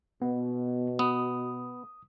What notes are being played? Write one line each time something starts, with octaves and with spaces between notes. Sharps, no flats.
B2 B3
B3 D#6